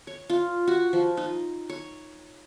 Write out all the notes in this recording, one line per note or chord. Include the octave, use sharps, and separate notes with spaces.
C#5
F4
F#4
F3
D#4
C#5